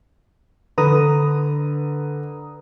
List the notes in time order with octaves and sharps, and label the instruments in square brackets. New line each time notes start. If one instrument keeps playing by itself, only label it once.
[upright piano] D3 [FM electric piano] B4 A#5 D#6